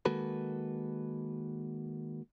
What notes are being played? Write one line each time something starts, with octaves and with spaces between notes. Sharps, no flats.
D#3 G#3 A#3 F#4 A4 B4